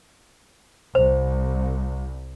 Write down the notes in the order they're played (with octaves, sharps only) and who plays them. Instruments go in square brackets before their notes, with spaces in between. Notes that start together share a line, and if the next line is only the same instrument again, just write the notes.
[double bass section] C2 [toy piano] C5